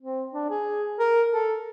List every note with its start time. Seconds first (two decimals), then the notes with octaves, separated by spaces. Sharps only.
0.01 C4
0.34 D4
0.50 G#4
0.99 A#4
1.32 A4